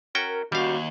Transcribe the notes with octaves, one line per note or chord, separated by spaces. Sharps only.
C#4 F#4 A#4 G5
D#2 G3 C#4 F#4 F5